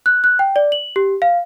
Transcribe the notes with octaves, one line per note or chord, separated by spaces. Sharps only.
F#6
F#6
G5
D5
F#7
G4
F5